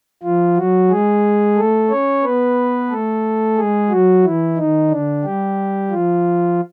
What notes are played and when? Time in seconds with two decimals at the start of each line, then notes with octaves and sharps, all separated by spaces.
0.23 F3 F4
0.57 F#3 F#4
0.90 G#3 G#4
1.57 A3 A4
1.90 C#4 C#5
2.24 B3 B4
2.90 A3 A4
3.57 G#3 G#4
3.90 F#3 F#4
4.24 E3 E4
4.57 D#3 D#4
4.90 D3 D4
5.24 G3 G4
5.91 F3 F4